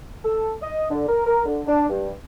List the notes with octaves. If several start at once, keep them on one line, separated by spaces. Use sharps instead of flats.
A4
D#5
D3
A#4
A#4
D3
D4
G2